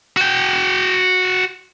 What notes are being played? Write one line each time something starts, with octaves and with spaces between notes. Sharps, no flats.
F#4 G5